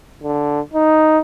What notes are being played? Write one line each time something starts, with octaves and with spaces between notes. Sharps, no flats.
D3
D#4